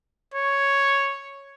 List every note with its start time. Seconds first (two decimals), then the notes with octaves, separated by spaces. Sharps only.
0.34 C#5